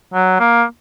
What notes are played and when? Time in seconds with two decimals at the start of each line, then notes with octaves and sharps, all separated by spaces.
0.14 F#3
0.40 A#3